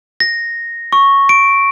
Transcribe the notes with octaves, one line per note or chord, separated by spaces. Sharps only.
A#6
C#6
D7